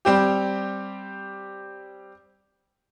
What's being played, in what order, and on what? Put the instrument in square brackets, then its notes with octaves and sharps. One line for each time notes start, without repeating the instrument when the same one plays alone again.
[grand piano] G3 C4 G4